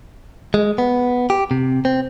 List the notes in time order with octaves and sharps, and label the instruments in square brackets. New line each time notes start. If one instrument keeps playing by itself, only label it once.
[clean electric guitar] G#3
B3
G4
C3
C4